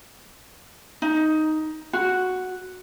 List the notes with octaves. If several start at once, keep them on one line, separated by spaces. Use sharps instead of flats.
D#4
F#4